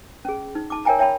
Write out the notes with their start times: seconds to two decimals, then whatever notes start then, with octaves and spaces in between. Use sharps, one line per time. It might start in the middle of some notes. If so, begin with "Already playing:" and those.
0.25 C#4 G#4
0.55 D#4
0.70 A5 D6
0.85 A#4 C#5 E5 G5 G#5 A#5
0.99 C#5 E5 G5 A5 B5